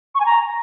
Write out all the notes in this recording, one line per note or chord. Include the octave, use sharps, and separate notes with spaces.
C#6
G#5
A#5